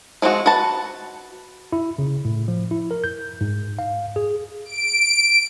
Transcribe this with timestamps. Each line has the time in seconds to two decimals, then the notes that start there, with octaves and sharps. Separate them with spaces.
0.22 F3 G#3 C4 D#4 F#4
0.46 F#4 B4 A5
1.73 E4
1.98 C#3
2.25 A2
2.48 F3
2.71 E4
2.91 A#4
3.04 G6
3.41 G#2
3.79 F5
4.16 G#4
4.65 D7